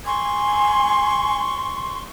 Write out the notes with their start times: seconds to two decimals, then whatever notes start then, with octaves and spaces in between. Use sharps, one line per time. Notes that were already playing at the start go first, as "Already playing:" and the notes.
0.06 G#5 C6 C#6